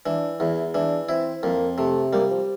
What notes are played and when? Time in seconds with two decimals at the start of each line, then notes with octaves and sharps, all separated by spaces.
0.05 E3 D4
0.40 E2 E4
0.74 E3 D4
1.09 C4 E4
1.43 F2 A#3
1.78 C3 A3
2.13 G3 A#3
2.30 F3